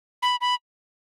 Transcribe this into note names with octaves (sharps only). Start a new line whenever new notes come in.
B5
B5